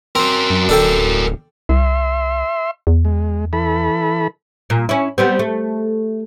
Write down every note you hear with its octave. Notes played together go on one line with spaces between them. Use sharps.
C4 F#4 A#4
F#2
D1 D4 A4 G5
C2 E5 C6
E2
G#3
E3 A4 B5
A#2
C#4 E4
G3 B3 C4
A3